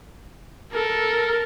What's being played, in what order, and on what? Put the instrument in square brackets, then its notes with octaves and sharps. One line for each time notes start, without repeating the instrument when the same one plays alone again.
[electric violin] A4 A#4